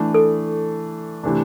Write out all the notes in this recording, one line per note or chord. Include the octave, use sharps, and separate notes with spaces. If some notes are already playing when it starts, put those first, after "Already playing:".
Already playing: E3 A3 D4
A4
C3 E3 A3 D4